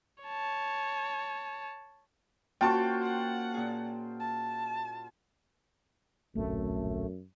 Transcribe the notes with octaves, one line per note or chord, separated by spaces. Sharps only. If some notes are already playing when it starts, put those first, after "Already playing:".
C#5 A5
A#3 C#4 F4 F#4 C5 G5 A5 C#6
F#5
A#2 G#4
A5
D1 A#1 F#2 A3 C4